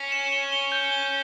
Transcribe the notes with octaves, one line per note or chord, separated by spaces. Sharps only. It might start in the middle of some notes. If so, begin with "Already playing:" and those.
Already playing: C#4
E7
G7
G7
G6
G7